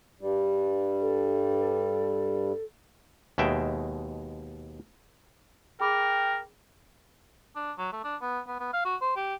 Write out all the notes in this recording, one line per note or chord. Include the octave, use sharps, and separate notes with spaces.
G2 G3
A4
D#2 B2 G#3 E5 G5
G#4 A#4 G5 B5 D6
D4
F#3
A3
D4
B3
B3
B3
F5
F#4
C5
G4